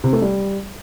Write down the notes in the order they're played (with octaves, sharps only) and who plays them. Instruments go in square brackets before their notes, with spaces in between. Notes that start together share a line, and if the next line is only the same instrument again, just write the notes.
[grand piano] C3
A3
G3